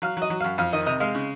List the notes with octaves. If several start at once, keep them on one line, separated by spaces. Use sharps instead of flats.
F#3 F5
F#3
D#5
F#3
F#2 F5
F2 F5
D#3 D#5
C3 D#5
G#3 F5
C#3